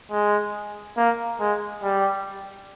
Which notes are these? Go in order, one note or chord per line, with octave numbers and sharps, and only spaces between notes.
G#3
A#3
G#3
G3